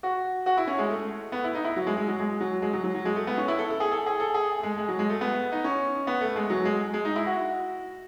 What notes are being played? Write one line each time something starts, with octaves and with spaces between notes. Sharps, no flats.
F#4
F#4
E4
C#4
G#3
A3
B3
E4
D#4
E4
F#3
G#3
G#3
F#3
G#3
F#3
G#3
F#3
F#3
F#3
G#3
A3
B3
C#4
E4
A4
A4
G#4
A4
G#4
A4
G#4
A3
G#3
G#3
F#3
G#3
A3
B3
D#4
C#4
B3
A3
G#3
F#3
G#3
G#3
D#4
E4
F#4